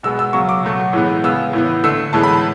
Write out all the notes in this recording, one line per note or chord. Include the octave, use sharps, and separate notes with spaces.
B2 G#3 B3 E6
E6
C#3 F#3 B3 C#6
D6
B2 F#3 A3
A2 E3 G#3 B3
C#3 G#3 B3 E6
A2 E3 B3
D3 A3 E6
A2 E3 G#3 B3 A5
B5
A5